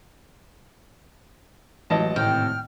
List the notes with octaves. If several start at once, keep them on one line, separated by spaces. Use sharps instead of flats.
A1 E3 F#3 G#3 D#5 A5
G#1 A2 C3 G5 F6